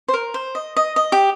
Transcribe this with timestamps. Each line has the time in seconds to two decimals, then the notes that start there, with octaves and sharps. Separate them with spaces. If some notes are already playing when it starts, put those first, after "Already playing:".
0.08 C5
0.13 A#4
0.34 C5
0.55 D#5
0.77 D#5
0.96 D#5
1.12 G4